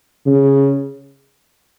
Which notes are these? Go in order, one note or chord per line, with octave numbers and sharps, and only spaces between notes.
C#3